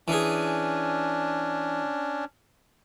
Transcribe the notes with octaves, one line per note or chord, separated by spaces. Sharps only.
E3 C#4 D4 G#4